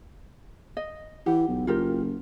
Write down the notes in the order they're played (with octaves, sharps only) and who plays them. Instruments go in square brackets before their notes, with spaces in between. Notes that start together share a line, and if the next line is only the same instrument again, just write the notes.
[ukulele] D#5
[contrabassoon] E3 [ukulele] G4 F#5
[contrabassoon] B1
[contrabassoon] F#1 [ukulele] F4 G4 A#4